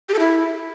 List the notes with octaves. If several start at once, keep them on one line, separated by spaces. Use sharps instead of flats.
G4
A4
E4